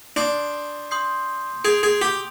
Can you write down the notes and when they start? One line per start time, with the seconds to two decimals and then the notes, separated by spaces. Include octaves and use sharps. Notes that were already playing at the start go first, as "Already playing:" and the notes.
0.16 D4 C6 D#6 G6 C7
0.91 C6 D#6 G6 C7
1.64 G#4 D#6 G6 D7 F7
1.83 G#4
2.02 G4